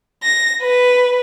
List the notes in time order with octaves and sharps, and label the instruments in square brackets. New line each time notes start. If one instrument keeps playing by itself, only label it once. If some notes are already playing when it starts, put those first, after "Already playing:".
[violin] A#6
B4